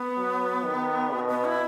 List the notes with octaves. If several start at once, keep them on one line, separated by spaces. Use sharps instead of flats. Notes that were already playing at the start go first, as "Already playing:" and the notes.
Already playing: B3
F#3
D#3
B2
B3
E4